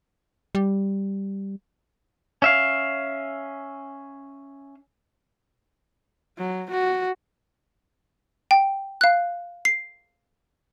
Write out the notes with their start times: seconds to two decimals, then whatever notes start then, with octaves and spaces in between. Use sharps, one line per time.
0.55 G3
2.42 C#4 E5 F5
6.37 F#3
6.70 F#4
8.51 G5
9.01 F5 F#6
9.65 C7